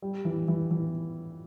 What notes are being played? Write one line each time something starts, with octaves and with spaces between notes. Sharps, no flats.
G3
E3
E3
E3